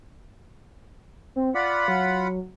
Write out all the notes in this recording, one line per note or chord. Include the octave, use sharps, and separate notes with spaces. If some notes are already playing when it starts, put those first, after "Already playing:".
C4
F4 D5 F#5 B5
F#3